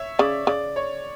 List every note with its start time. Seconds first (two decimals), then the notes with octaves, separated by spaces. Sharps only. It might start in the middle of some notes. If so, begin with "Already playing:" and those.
Already playing: C#5 E5
0.19 C#3 D5
0.47 C#3 D5
0.76 C#5